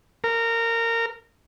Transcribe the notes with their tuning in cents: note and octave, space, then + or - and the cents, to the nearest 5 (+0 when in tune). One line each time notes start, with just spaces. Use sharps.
A#4 -20